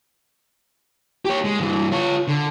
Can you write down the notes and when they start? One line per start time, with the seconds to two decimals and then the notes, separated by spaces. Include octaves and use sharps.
1.25 G4 C#5
1.44 G#3
1.59 G2 E3
1.92 F4 C#5
2.28 D3